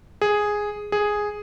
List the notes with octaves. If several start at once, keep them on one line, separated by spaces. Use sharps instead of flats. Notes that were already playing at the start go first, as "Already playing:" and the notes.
G#4
G#4